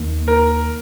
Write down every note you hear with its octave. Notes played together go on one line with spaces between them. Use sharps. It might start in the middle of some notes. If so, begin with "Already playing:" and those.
Already playing: D#2 D#3 A#3
A#4